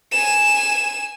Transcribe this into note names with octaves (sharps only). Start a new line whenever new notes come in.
G#5 E7